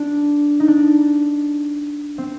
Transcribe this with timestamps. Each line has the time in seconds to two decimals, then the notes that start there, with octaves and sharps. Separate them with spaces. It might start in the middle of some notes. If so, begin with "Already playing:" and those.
Already playing: D4
0.60 D#4
0.68 D4
2.18 C4